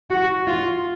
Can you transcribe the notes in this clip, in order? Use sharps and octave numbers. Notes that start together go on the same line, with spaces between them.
F#4
F4